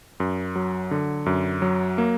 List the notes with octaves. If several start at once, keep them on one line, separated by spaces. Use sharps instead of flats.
F#2
F#3
D3
F#2
F#3
A#3